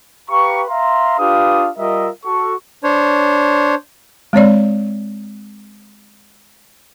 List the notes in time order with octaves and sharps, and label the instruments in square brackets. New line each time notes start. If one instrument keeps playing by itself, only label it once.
[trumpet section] G4 B4 F5 A#5 C#6
E5 F5 A#5 C6
D4 F4 G4 B4 F5 D#6
G3 F4 A#4 D#5 E5
F#4 A4 C#6
[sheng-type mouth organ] D4 C5 C#5
[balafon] G#3 C4 C#5 D5